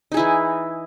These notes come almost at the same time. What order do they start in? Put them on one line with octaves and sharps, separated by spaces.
D#4 G#4 E4 E3